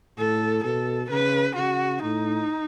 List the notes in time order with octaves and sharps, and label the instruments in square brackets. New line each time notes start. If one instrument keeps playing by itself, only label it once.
[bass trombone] A2 [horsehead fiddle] A4
[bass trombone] B2 [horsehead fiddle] A4
[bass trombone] C#3 [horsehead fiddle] B4
[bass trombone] C#3 [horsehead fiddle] F#4
[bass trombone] A2 [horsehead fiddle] D#4